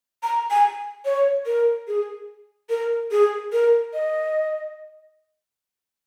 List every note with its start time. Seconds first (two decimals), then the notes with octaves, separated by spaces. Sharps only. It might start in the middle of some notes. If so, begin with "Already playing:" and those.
0.23 A#5
0.51 G#5
1.05 C#5
1.46 A#4
1.88 G#4
2.70 A#4
3.11 G#4
3.52 A#4
3.94 D#5